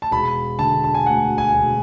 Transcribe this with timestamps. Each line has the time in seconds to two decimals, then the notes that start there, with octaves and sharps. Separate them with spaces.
0.02 A5
0.11 E1 B5
0.59 D3 A5
0.84 A5
0.95 G#5
1.06 D2 F#5
1.38 G#5
1.54 E1